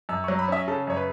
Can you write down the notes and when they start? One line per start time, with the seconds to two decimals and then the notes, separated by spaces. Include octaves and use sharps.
0.09 F#2 E6
0.24 C#6
0.28 F#3
0.39 B5
0.48 C#4 E5
0.68 C#3 A4
0.87 F#2 C#5
0.97 B4